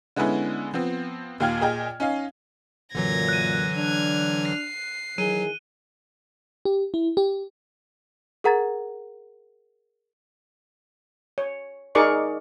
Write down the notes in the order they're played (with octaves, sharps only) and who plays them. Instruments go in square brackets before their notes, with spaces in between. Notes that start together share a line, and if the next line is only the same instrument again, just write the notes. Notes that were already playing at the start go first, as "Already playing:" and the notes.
[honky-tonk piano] D3 G#3 B3 C#4 E4
F3 B3 C4
D#2 A#2 F5 G5 F6 G#6
A#2 G#4 D#5 G5 G#6
C#4 D#4 F5
[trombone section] F#2 A#2 [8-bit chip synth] D3 E3 F#3 [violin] G#6 A#6
[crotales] F#6 D#7
[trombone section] D4 [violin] F6 G#6
[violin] C7
[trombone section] D#3 E3 G#4 [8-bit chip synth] F#3 [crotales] D#7 G7
[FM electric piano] G4
E4
G4
[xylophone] G#4 A#4 F#5 A#5 G#6 A6
[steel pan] C#5
D#4 G#4 A#4 D5 C#6 D6